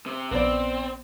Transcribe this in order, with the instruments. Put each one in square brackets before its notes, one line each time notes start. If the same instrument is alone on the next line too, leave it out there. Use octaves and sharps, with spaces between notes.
[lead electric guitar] C3
[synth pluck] A#1 [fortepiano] B3 D5 [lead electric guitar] C4